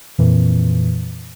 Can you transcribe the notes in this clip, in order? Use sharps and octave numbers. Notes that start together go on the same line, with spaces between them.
F2 A#2 E3